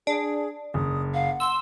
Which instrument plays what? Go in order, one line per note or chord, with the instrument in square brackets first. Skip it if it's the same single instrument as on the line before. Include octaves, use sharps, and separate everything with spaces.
[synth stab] D4 [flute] G#4
[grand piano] F#1 [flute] D#6
[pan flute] F5 [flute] F#5
[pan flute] C6 [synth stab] E6